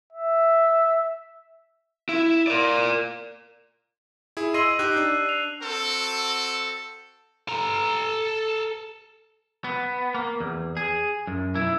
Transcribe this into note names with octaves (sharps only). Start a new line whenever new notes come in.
E5
E4
A#4 D5
E4 G#4
D#5 C6 E6 A#6 C7 D#7
D#4 G4 F#6
D4
C7 F7
C4 F#4 A4
A4 A#5
B3
A#3
E2
G#4
F#2
B1 E4